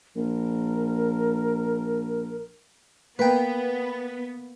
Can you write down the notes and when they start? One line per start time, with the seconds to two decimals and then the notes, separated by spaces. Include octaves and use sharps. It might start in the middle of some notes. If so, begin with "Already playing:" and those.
0.16 A#1 A#4
3.19 A#3 B3 B4 G5